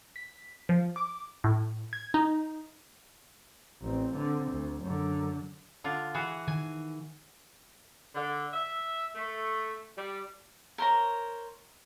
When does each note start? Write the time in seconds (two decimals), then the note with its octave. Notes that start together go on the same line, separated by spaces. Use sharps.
0.16 B6
0.69 F3
0.96 D6
1.44 A2
1.93 G#6
2.14 D#4
3.81 A1 C4
4.15 D3 C4
4.52 D2
4.82 F#2 D3
5.84 D3 F4
6.14 E3 F#4 G#4
6.48 D#3 G#5
8.15 D3
8.53 E5
9.15 A3
9.96 G3
10.78 A#4 C5 C#5 A#5